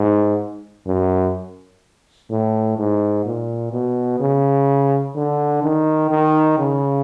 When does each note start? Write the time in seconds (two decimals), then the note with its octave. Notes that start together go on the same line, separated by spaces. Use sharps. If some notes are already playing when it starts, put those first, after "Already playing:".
Already playing: G#2
0.87 F#2
2.31 A2
2.78 G#2
3.25 A#2
3.72 B2
4.20 C#3
5.16 D3
5.63 D#3
6.11 D#3
6.58 C#3